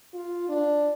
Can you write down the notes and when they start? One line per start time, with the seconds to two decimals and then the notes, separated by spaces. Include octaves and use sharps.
0.13 F4
0.49 D4